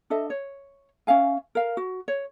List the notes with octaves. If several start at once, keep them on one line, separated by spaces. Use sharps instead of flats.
D4 A4 D#5 E5
C#5
C#4 E5 F5 G#5
A#4 F5
F#4
C#5